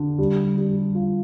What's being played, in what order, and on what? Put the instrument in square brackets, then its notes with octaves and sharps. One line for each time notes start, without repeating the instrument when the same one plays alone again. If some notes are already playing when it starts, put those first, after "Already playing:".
Already playing: [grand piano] D3
G3
G3
F4